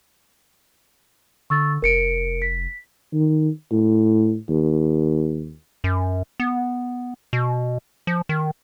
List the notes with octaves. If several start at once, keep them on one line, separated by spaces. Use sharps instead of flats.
D3 C#6 E6 A6
F1 A#4 C#7 D7
B6
D#3
A2
D#2
F#2
B3
B2
F3
D#3